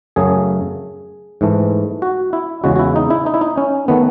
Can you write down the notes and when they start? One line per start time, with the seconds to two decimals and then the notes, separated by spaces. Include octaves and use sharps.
0.16 F#2 C#3 F#3 A3 G#4
1.41 G#2 E3 A3
2.02 F#4
2.33 E4
2.64 E2 C#3 G#3 F#4
2.75 F#4
2.79 E4
2.96 D#4
3.10 E4
3.26 D#4
3.34 E4
3.41 D#4
3.58 C#4
3.88 D#3 A3 B3